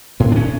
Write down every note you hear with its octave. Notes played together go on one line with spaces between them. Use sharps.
A2 B3
D4
C#4